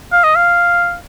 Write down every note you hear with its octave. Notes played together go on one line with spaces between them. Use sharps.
F5
D#5
F5